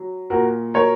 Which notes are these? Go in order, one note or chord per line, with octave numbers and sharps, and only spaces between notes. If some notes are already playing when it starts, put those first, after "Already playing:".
Already playing: F#3
A#2 F#4 A#4
F#3 A#4 C#5